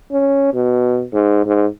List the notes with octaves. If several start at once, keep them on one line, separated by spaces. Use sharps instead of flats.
C#4
B2
G#2
G#2